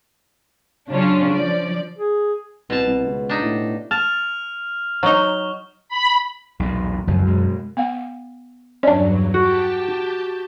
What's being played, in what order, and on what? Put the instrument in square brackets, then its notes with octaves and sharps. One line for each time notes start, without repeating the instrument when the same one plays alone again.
[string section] C#3 F#3 C#4 D4 F4
F3 D5
[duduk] G#4
[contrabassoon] C2 [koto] B2 A5
[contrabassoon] C2
C#2
[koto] D4 D#4
[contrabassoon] A2
[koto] A5 [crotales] F6 F7
[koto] F#3 D#4 [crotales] C#6 G7
[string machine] B5
[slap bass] B1 E2 A#2
[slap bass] F1 C#2 F3 [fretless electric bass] F#2
[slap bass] B2 G#3
[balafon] B3 F5 F#5
[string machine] E2 G2 F#3 [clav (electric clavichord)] C#4 D4 [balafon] D5
[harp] F#4 [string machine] G4 G5 A5